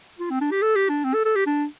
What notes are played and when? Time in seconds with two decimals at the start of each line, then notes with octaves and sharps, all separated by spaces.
0.19 F4
0.31 C4
0.41 D4
0.51 G4
0.62 A4
0.76 G4
0.89 D4
1.04 C4
1.14 A4
1.25 A4
1.36 G4
1.46 D4